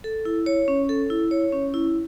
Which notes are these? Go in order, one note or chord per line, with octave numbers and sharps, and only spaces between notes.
A4
E4
C#5
C#4
A4
E4
C#5
C#4
E4